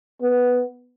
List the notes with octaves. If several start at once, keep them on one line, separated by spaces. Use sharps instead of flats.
B3